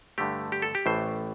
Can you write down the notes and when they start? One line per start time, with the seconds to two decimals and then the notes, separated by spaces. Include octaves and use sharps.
0.18 G2 D3 A3 G4
0.52 G4
0.62 A4
0.75 G4
0.86 A1 A2 E3 A3 C5